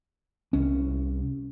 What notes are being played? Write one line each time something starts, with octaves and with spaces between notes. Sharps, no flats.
C2 C#4